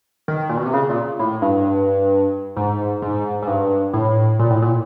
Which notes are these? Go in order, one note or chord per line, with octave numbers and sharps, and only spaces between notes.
D#3
A#2
B2
C3
C#3
A#2
A2
G2
G#2
G#2
G#2
G2
A2
A#2
A2
A#2